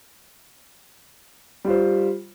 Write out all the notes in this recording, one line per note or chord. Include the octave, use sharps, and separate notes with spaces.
G3 F4 C5